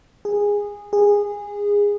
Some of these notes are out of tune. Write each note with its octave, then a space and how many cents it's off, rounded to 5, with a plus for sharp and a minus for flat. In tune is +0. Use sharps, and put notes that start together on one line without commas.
G#4 -15
G#4 -20